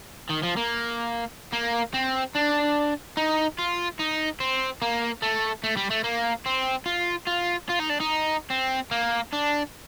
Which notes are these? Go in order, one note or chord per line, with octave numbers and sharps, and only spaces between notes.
D#3
F3
A#3
A#3
C4
D4
D#4
F4
D#4
C4
A#3
A3
A3
G3
A3
A#3
C4
F4
F4
F4
D#4
D4
D#4
C4
A#3
D4